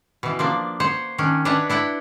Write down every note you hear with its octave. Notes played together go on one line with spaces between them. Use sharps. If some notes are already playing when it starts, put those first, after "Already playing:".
B2 E3
F3 A#3 D4
C5 C#5 F#5
D#3 C#4 D4
D4 B4 C#5 D#5 E5 F#5
D4 E4 F#5 G5